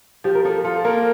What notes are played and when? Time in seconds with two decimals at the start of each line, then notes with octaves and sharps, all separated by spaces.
0.24 F3 G4
0.35 A#4
0.45 F3 A4
0.65 F4 A4
0.85 A#3 A#4